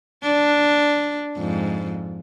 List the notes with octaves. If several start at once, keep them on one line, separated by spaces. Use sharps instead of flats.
D4
F2 G#2